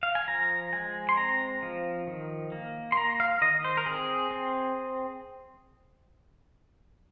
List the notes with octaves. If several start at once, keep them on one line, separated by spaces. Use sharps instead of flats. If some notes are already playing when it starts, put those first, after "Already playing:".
F5
G#5
F3 A#5
G#3 G#5
C6
C4 A#5
F3
D#3
A#3
C6
A#3 A#5
F5
D#3 D#5
C5
A#4
C4 G#4
C4